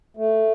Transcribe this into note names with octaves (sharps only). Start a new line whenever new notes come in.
A3